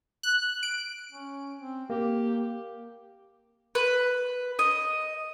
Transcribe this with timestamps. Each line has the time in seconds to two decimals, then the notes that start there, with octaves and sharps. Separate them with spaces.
0.23 F#6
0.63 D7
1.12 C#4
1.59 C4
1.90 A#3 G4
3.75 B4
4.59 D#5